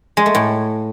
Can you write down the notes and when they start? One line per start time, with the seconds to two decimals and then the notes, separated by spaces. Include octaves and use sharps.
0.17 G#3
0.26 A3
0.35 A2